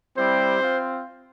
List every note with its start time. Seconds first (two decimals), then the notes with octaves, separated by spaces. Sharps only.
0.17 G3 C4 E4 G4 C5
0.61 C4 F4